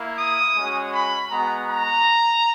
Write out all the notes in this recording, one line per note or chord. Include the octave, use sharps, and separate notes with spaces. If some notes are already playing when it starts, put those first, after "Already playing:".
Already playing: A#3 E4
D#6
G#3 C#4 F#4
B5
G#3 B3 F#4 A#5
A#5